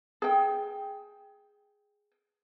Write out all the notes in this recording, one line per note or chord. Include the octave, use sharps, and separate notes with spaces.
G#4 G5